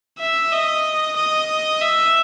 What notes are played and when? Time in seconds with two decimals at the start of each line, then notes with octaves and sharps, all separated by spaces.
0.19 E5
0.52 D#5
1.17 D#5
1.82 E5